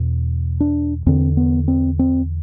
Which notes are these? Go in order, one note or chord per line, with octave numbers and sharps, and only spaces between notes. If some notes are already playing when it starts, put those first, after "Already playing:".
Already playing: E2 B2
D4
E2 D3 C4
B3
C4
C4